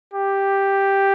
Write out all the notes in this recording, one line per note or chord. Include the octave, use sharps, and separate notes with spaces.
G4